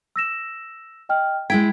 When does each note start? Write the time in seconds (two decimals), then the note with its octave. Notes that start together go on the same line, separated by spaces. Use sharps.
0.16 E6 A#6 E7
1.09 D#5 G5 F6
1.50 G#3 E4 G5 G#6 B6